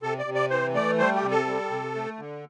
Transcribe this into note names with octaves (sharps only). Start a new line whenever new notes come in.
C3 A4
D5
C3
D5
E3 C5
A3 D5
G3 C5
G4
C3
A4
G3
C3
A3
D3